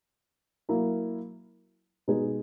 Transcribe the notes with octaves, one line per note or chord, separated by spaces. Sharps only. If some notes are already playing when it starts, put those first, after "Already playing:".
F#3 A#3 E4 A#4
B2 G#3 D#4 G#4 B4